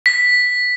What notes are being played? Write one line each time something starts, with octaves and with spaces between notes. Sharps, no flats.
B6